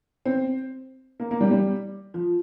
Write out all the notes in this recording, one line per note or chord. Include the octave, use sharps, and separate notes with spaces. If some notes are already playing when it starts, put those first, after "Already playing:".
C4
A#3
A#3
G3
G3
F3